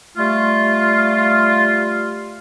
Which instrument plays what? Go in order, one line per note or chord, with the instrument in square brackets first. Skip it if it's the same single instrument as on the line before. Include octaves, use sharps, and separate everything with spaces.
[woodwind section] G3 A3 F4